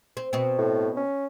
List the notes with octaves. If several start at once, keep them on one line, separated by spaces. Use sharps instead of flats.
C4
B2 C4
A2
C#4